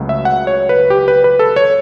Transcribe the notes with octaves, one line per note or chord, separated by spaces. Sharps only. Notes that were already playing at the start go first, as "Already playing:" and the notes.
Already playing: C#2 C#3 F#3 A3
E5
F#5
C#5
B4
G4
B4
B4
A4
C#5